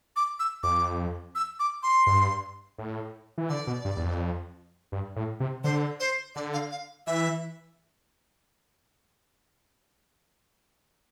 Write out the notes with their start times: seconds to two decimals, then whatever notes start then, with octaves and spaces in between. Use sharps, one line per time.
0.16 D6
0.39 E6
0.63 F2 D6
1.35 E6
1.59 D6
1.83 C6
2.07 G2
2.78 A2
3.38 E3
3.49 D3 D5
3.67 B2
3.85 G2
3.97 E2
4.04 F2
4.92 G2
5.16 A2
5.40 C3
5.64 D3 C5
6.00 C5
6.35 D3 D5
6.53 F5
6.71 F5
7.07 E3 E5